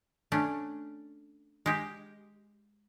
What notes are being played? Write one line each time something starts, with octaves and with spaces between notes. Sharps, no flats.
A3 C#4 D4
G#3 G4